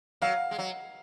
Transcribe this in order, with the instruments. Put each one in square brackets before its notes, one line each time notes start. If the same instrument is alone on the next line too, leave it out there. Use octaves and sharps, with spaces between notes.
[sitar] F#3 [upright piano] F5
[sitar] G#3
F#3